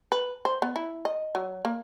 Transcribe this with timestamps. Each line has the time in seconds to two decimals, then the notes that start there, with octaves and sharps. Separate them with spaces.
0.12 B4
0.45 C5
0.62 B3
0.76 E4
1.05 D#5
1.35 F#3
1.65 A#3